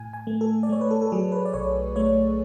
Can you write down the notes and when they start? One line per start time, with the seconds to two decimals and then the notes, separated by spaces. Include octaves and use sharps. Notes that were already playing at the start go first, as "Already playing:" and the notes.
Already playing: A2 G#5
0.13 G#5
0.27 A3
0.41 A4
0.63 D5
0.69 A3 C#5
0.81 B4
0.91 A4
1.02 A4
1.12 F#3 G#4
1.32 B4
1.45 D5
1.54 B1 C#5
1.96 A3 C#5